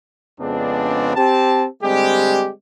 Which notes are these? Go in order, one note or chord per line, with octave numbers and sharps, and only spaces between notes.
F2 C#3 G#3 B3 C4 D4
C4 G4 A5
D3 G3 G#3 C4 G4